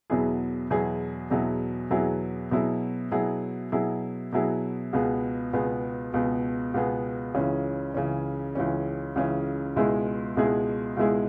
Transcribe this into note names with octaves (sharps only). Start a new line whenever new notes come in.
E2 B2 F#3 E4 G#4
E2 B2 F#3 E4 G#4
E2 B2 F#3 E4 G#4
E2 B2 F#3 E4 G#4
B2 F#3 E4 G#4
B2 F#3 E4 G#4
B2 F#3 E4 G#4
B2 F#3 E4 G#4
C#2 B2 B3 G#4
C#2 B2 B3 G#4
C#2 B2 B3 G#4
C#2 B2 B3 G#4
C#2 C#3 E3 C#4
C#2 C#3 E3 C#4
C#2 C#3 E3 C#4
C#2 C#3 E3 C#4
C#2 B2 G#3 E4 G#4
C#2 B2 G#3 E4 G#4
C#2 B2 G#3 E4 G#4